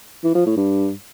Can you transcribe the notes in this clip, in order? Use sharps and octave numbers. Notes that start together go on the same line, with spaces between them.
E3
F3
A2
G2